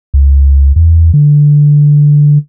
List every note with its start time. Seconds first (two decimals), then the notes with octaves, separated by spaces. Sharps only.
0.14 C#2
0.76 E2
1.14 D3